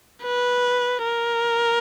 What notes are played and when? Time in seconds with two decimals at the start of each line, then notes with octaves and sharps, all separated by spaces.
0.24 B4
1.04 A#4